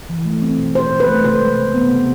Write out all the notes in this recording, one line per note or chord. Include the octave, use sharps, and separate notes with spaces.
E3
A3
C4
B2
B2 C5
B2
B4
A3
C3 C5
G#3
C3
B3
C3